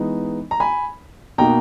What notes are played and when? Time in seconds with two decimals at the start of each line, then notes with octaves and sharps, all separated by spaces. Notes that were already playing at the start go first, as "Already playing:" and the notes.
Already playing: E3 G#3 B3 D#4
0.51 A#5
0.60 G#5 B5
1.38 B2 A#3 D#4 G5 A#5